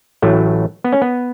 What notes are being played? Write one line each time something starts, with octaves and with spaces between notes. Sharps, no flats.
A1 A2 F#3 A3
B3
C#4
B3